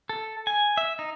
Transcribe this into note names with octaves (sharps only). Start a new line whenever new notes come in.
A4
G#5
E5
D#4